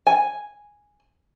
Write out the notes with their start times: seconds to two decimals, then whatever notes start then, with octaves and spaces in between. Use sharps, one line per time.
0.07 G#5